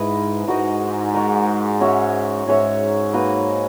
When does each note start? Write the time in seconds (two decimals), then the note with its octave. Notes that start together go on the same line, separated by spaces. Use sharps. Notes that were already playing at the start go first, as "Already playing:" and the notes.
Already playing: G#2 E4 B4 D#5
0.48 G#2 D#4 F#4 A#4 D#5
1.14 D#4 F#4 A#4 D#5
1.80 C#4 F#4 C#5 E5
2.47 G#2 C#4 F#4 C#5 E5
3.13 A#3 D#4 F#4 B4